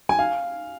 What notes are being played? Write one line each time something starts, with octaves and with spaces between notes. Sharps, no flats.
G#5
F5